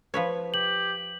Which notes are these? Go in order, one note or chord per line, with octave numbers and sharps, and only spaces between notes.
F3 B4 C#5
G4 F#7